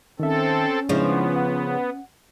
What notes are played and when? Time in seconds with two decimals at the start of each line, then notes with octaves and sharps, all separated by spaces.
0.20 D#3 C4 C#4 A4 E5
0.89 C#3 F3 G#3 B3 D4 E4
1.36 F#5